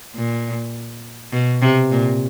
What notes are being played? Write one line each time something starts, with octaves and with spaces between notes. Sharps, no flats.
A#2
B2
C3
A#2